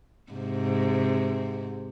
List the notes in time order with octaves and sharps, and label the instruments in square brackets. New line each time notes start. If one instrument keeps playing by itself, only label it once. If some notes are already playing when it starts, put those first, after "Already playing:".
[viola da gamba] G#2 C3